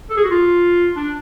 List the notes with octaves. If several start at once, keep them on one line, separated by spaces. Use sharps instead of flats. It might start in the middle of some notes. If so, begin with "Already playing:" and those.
A4
G#4
F#4
F4
D4